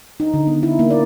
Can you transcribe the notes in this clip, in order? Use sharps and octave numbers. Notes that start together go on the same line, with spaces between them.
D#4
D3
B3
E4
A#3
D5